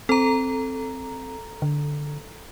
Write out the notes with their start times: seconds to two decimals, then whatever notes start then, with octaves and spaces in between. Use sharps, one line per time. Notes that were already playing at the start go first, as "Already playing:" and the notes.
0.09 C4 A4 A#5
1.62 D3